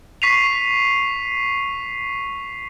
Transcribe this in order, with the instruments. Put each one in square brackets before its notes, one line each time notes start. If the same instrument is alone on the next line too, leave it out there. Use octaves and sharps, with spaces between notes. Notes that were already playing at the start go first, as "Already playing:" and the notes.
[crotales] C#6 B6 C7 D#7 F7